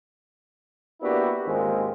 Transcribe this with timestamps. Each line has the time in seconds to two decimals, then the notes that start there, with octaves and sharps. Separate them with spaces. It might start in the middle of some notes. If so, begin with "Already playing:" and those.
1.01 A#3 B3 D4 E4 F#4 G4
1.45 D#2 G#2 D#3 G#3 C4 F4